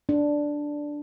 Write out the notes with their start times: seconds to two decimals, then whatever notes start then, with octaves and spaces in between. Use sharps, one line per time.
0.09 D4